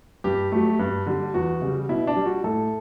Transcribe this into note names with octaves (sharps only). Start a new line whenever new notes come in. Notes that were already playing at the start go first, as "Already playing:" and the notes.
G2 G4
F#3 A3
G2
D3 G3
E2 F#4
C#3 G3
B2 E4
D4
G3
F#4
A2 A4